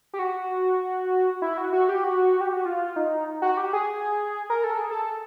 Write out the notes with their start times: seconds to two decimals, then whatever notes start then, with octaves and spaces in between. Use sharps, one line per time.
0.13 G4
0.19 F#4
1.42 E4
1.58 F#4
1.73 F#4
1.89 G4
2.04 F#4
2.41 G4
2.53 F#4
2.66 F4
2.96 D#4
3.42 F#4
3.57 G4
3.73 G#4
4.50 A#4
4.64 A4
4.78 G#4
4.91 A4